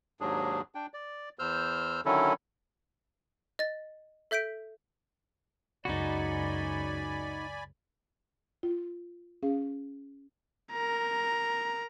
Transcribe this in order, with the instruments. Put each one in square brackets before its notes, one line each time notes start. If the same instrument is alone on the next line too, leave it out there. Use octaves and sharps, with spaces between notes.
[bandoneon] D#2 G#2 F#3 D4 G#4
D4 G5
D5
E2 C5 E6 F6 G6
D3 D#3 F#3 C#4 E4 A4
[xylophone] D#5 A6
A4 E5 G6 B6 D7
[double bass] C#2 F#2 [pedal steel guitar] D#4 F#4 [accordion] D5 G#5 B5
[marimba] F4
C#4 G#4 F5
[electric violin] A#4 A#5